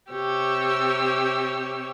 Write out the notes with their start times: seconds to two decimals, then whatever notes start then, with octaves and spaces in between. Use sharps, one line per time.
0.11 C3 G4 C#5 E6